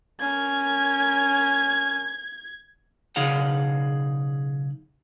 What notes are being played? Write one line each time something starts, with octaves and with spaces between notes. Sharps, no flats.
C#4 A#4 G#6
B1 C#3 D#4 G#4 F5 F#5